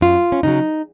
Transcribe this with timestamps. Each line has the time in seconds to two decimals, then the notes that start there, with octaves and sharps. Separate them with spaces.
0.01 F#2 F4
0.32 C#4
0.43 C#3 F#3 D#4